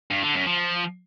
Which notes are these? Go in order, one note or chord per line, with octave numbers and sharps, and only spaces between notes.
G2
D3
F#2
F3